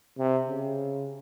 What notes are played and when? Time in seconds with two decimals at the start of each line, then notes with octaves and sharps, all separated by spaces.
0.18 C3
0.48 C#3